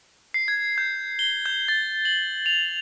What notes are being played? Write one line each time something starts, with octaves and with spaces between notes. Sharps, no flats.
C7
G#6
G6
G7
G6
A6
F#7
F7